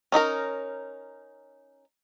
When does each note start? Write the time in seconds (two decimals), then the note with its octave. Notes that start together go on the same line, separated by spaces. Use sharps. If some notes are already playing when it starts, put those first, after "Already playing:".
0.12 C#4 D#4 E4 A#4